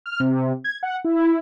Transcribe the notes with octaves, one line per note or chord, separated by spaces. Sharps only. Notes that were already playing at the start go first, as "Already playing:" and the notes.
F6
C3
G#6
F#5
E4